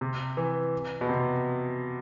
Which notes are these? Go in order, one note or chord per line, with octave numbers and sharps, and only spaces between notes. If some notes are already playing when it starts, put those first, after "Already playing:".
C3
E3
B2
C3